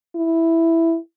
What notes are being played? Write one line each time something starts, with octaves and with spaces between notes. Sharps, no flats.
E4